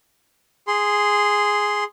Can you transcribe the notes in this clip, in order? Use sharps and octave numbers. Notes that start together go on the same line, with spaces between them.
G#4 C6